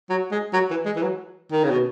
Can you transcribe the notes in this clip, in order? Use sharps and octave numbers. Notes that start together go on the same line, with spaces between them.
F#3
G#3
F#3
E3
G#3
E3
F#3
D#3
C#3
B2